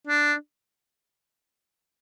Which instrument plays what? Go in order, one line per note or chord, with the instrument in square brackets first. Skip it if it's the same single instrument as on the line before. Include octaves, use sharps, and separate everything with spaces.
[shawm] D4